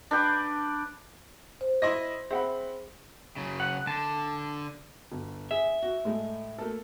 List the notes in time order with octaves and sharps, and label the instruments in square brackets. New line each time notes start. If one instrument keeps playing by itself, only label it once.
[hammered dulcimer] D4 B4 G5 D6
[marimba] C5
[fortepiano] E4 D#5 [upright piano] C6 A#6
[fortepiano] C4 [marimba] G#4 [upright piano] E5 F#5 B5
[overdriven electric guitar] C#3 F#3
[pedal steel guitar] F#5
[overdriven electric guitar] D3 [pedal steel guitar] A5
[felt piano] G1
[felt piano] G#4 [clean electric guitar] E5
[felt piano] F#4
A2 G#3 A3
A3 A#3 A4